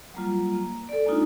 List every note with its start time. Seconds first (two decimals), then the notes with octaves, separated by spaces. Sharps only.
0.14 F#3 G3 A#3 F4
0.52 A#3
0.89 A4 D5
1.06 G#3 A#3 D4 D#4 F4